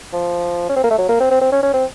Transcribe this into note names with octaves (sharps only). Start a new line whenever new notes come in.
F3
C#4
C4
A#3
A3
F#3
A#3
C4
C4
C4
C#4
C#4
C4